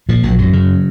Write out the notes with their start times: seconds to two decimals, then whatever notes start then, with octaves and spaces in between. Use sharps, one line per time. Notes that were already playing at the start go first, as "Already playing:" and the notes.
0.09 A#2 F3
0.23 A#1 F#3
0.38 F#2 F#3
0.53 C#3